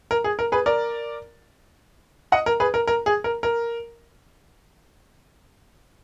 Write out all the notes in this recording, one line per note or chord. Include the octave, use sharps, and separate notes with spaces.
A#4
G#4
A#4
G#4 B4
A#4 D5
D#5 F#5
A#4
G#4 B4
A#4
A#4
G#4
A#4
A#4